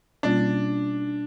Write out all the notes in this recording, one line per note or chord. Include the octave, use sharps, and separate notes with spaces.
B2 G3 A#3 C#4 D4 F4